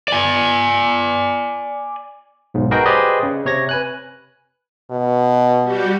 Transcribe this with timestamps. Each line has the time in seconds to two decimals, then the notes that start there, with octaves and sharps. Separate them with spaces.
0.08 D5 G#5
2.54 B1 G#2
2.71 F#4 G#4 A#4 B4 D#5 G5
2.86 G4 G#4 B4 C5 D5 D#5
3.23 C#3
3.46 C3 C#5 G#6 A#6
3.69 B4 G#5 F#6
4.91 B2
5.62 G3 F#4 G4